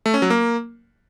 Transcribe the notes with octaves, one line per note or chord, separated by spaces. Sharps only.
A3
C#4
F#3
A#3